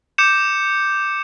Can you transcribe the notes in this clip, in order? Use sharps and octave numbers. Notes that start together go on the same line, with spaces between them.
D6 G6 C#7 E7